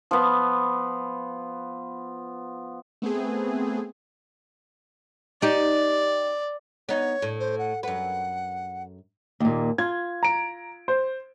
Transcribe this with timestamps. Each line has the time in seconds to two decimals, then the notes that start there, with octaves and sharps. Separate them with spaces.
0.11 F3 B3
3.02 A3 B3 C4 G#4
5.42 D#4 G4 D5
6.89 B3 D#4 C#5
7.22 A2
7.40 C5
7.59 F#5
7.83 F#2 B4 F#5
9.40 D#2 A#2
9.78 F4 G#6
10.23 A#5 D7
10.88 C5